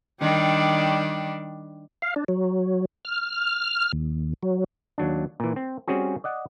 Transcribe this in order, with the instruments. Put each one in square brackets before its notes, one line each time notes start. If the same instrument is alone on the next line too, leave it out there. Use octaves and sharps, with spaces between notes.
[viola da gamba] D#3 G3 D4
[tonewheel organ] F5
D4
F#3
F6
D#2
F#3
[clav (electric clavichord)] D#2 F#3 D4
A#2 E3
C4
G3 C4 C#4 F#4 G#4
D5 D#5 F#5